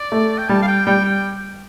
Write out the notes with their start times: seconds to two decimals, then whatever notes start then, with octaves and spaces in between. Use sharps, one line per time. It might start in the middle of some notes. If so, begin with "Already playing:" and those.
Already playing: D5
0.12 A3
0.38 G5
0.49 G3 A5
0.62 F5
0.68 G5
0.86 G3 G5
1.05 G5